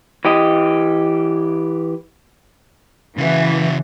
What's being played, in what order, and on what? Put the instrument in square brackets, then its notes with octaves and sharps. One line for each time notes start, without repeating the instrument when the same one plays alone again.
[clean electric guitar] E3 G4 D#5
[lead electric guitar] C#3 F#4 [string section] E3